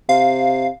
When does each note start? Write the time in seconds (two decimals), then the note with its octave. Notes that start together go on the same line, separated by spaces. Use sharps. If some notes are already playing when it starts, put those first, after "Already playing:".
0.09 C3 F5